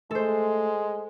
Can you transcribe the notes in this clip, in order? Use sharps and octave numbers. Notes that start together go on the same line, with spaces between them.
G#3 A3 A4 C5